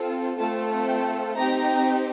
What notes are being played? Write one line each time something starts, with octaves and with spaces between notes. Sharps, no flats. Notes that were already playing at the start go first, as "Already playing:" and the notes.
Already playing: C4 F4 A4
A3 C4 F4 A4 A5
G5
C4 D#4 G4 A#5